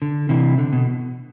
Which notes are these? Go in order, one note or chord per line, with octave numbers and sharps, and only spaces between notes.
D3
C3 E3
D3
B2